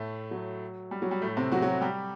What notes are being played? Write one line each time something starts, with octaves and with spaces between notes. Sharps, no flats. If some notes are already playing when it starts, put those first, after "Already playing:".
Already playing: A2 A3
F#3
G3
F#3
G3
A2 A3
C3 C4
F#3 F#4
F#3 F#4
G3 G4